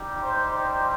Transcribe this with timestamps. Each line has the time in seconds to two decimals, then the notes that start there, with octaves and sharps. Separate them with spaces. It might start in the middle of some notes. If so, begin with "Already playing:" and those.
Already playing: G3 D#4 G4
0.22 C5
0.58 C5